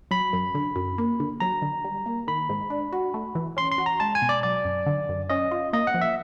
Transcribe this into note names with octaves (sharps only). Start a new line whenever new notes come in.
F#3 B5
F#2
D3
F#2
A#3
D3
F#3 A#5
D3
G3
A#3
D#3 B5
G#2
D4
F#4
A3
E3
C#4 C6
C6
F#4
A#5
G#3 A5
G#5
B2
D5
F#3 D5
F#2
D3
F#2
C#4 D#5
F4
A#3 D#5
F#5
F3
E5